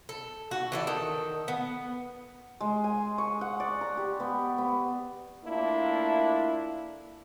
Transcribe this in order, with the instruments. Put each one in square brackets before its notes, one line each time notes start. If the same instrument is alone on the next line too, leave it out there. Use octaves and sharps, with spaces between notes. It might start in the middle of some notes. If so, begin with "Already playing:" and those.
[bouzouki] A4
F#4
E3 A4 D5
D#3 A4
B3
[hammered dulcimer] G#3
G#5
C#6
F#5
D5
A#5
G4
B3
B3
[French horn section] A3 A#3 D4 E4 F4